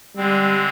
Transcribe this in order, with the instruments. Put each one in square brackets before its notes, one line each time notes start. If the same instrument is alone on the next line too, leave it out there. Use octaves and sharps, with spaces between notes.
[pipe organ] D3 G#3 C4 [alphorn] G3